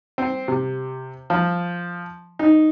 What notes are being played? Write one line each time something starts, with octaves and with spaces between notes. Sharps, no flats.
C4
C3
F3
D#4